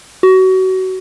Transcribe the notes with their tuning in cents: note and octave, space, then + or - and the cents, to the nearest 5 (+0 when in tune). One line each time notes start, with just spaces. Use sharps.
F#4 +25